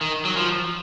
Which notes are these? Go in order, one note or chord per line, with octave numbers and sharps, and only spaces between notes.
D#3
F#3
F3